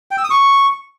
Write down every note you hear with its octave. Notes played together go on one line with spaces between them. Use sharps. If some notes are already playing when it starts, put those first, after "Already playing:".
G5
E6
D#6
C#6